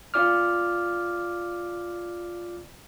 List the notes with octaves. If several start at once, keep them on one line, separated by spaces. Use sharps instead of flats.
F4 D5 D6 F6